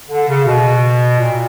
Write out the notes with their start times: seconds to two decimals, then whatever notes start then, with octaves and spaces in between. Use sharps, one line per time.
0.09 D3
0.27 C#3
0.45 B2
1.18 A#2